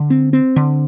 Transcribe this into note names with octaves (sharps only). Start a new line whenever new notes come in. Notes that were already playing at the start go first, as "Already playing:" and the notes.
Already playing: D3
C4
C4
D3